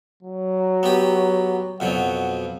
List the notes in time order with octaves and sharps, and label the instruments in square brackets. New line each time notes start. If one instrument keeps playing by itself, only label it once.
[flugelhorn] F#3
[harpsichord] B3 G4
[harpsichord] F2 B2 F#3 [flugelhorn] F#5